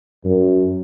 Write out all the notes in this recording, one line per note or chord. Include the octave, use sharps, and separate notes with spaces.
F#2